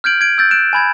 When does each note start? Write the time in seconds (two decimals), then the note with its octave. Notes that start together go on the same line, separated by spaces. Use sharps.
0.04 F6 G6 G#6 D7 F#7
0.21 G#6 D7
0.38 E6 G6 A6
0.51 F#6 D7 E7
0.73 G#5 B5 G#6